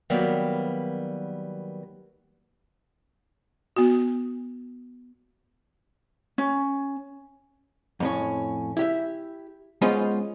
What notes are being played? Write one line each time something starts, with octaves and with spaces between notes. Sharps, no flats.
D#3 F#3 G3 A#3 B3
B3 F#4
C#4
F2 A2 C#4
E4 G4 E5
G#3 B3 C#4 F4 C5 D#5